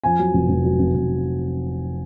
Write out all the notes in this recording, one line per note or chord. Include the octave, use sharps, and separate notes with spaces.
F2 G#5
F#3
F1
F1
F#3
F1
F1